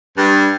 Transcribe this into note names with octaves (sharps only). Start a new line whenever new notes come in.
G2